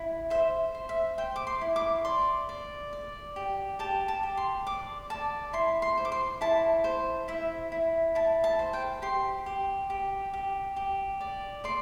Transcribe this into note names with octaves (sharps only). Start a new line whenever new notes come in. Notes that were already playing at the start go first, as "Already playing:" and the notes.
Already playing: E4
C5 E5
C5
E5
C5 G5
D6
C6
E4
D6
D5 C6
D5
D5
G4
G4 A5
A5
G4
C6
D5 D6
D5 A5
E4 C6
C6
C5
D6
C6
E4 A5
C5
E4 E5
E4
E4 A5
A5
C5
G5
G4 C6
G4
G4
G4
G4
D5
D5 C6